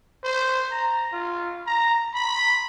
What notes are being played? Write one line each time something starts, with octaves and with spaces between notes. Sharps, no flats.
C5
A#5
F4
A#5
B5